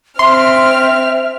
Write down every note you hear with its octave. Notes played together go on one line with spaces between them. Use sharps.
C4 E5 C6 F6